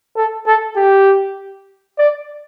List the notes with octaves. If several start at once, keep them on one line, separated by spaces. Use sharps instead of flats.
A4
A4
G4
D5